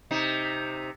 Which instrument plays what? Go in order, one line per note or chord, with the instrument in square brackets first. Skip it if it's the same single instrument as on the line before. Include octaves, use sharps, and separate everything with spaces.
[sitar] C3 D#4